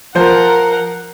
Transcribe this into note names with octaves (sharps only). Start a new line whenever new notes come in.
F3 A#4 C5 F#5